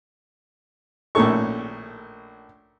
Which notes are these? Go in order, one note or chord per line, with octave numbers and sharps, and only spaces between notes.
A#1 A2 D#3 C#4 A4 C#6